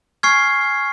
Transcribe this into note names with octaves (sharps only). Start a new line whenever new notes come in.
G#5 C#6 F6 G#6 C7